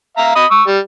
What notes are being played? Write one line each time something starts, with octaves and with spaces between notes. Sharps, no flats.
E5 F5 A#5
D#5 B5 D#6
C#6 E6
G3